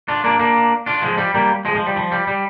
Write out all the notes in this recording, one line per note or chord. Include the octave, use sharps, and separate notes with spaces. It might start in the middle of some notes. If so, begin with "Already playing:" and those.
D4 F4
A#3 D4
A#3 D4
D4 F4
F3 G#3
G3
G3 A#3
F3 G#3
F3
G3
F3
G3
G3